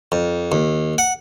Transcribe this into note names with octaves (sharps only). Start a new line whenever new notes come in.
F2
D#2
F#5